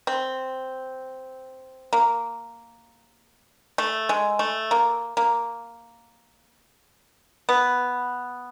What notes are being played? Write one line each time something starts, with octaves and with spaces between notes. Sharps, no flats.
C4
A#3
A3
G#3
A3
A#3
A#3
B3